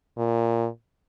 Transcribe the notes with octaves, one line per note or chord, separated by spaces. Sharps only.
A#2